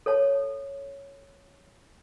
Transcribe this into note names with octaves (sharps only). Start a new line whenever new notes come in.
A4 C#5 A5